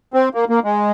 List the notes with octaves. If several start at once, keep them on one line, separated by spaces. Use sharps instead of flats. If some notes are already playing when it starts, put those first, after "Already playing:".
C4
A#3
A#3
G#3